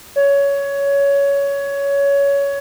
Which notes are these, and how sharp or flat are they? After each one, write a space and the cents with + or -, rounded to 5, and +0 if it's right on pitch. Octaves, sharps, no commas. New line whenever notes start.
C#5 +15